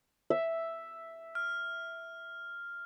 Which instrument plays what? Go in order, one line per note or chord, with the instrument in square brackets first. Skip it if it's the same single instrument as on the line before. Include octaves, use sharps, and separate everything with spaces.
[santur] E5
[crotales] F6